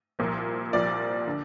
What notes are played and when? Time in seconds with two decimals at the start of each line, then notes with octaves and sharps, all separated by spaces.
0.19 C2 A#2 F3
0.73 C2 A#2 F3 D5
1.27 D3